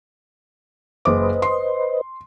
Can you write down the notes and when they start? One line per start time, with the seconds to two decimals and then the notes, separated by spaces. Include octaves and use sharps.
1.05 F#1 B4 C5 D#5 D6
1.42 C6